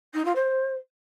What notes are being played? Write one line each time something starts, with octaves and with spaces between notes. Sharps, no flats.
D#4
F4
C5